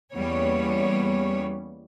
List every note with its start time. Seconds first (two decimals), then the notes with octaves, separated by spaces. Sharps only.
0.12 E2 G3 A#3 B3 C#4 C#5